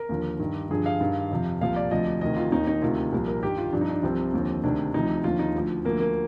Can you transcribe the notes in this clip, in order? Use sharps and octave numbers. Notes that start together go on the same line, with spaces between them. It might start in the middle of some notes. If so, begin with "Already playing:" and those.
Already playing: A#4
D#2 D3 F3
G2 D#3
G2 D3 F3 G#4
F5
G2 D#3
F2 C3 F3
C2 A#2 F3 F5
D5
D2 C3 F3 D#5
D2 C3 D#3 D#5
F4
D#2 D#3 D#4
D#4
D2 C3 D#3 F4
C2 A#2 F3
A#4
G2 D#3 G4
F4
G2 F3 D4
D#4
D4
C2 C3 F3 C4
D#2 D3 F3
D2 C3 D#3 D4
D2 C3 F3 D#4
D#2 D3 F3 F4
D#4
D2 D3 F3
D2 D3 F3 A#3
A#3